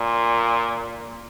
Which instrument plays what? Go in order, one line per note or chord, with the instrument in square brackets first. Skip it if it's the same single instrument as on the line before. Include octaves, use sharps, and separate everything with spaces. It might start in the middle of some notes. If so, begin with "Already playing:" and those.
Already playing: [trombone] A#2